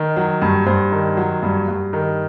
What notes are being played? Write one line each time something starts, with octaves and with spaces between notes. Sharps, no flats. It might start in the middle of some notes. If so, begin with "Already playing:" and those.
Already playing: D#3
F#3
G2
G2 C5
D#3
F#3
G2
G2
D#3